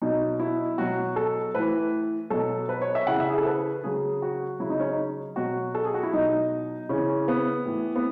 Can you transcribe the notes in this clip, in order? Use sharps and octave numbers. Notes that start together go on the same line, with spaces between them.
B2 F#3 D#4
E4
B2 F#3 F#4
A4
A2 E3 B4
B2 F#3 A4
B4
C#5
E5
C#3 E3 F#5
E5
G#4
A4
B4
C#3 F#3 G#4
F#4
C#3 F#3 E4
D#4
C#4
D#4
B2 F#3 F#4
A4
G#4
F#4
E4
B2 F#3 D#4
C#3 E3 C#4
B3
A2 E3
B3